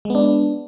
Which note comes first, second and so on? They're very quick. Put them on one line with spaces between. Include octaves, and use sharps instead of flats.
G#3 B3 D4